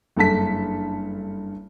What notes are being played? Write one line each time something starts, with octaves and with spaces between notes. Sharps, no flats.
F#1 G2 A4 A5 B6